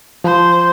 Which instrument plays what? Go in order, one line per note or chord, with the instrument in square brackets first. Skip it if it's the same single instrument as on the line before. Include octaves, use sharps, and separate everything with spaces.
[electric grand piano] F3 [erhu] C5